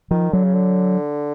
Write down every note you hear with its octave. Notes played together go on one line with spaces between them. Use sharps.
D#3 F3
D3 F#3
C#3
D3